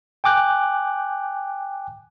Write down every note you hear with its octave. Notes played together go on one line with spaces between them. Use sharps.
G5 G#5 D6 F#6 G6